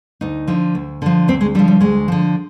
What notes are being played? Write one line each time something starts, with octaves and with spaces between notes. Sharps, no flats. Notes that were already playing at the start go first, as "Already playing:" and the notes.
D2 D#4
D3 F3
D2
D3 F3
D2 C4
G#3
D3 F3 G3
G3
D2 G#3
D3 F3